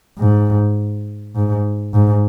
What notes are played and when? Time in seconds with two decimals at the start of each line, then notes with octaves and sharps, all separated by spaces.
0.19 G#2
1.36 G#2
1.94 G#2